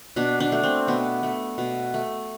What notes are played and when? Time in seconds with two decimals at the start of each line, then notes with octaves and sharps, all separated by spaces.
0.16 B2 D4
0.40 D4
0.52 A3
0.63 C4
0.87 B2 B3
1.23 A3
1.58 B2
1.94 A3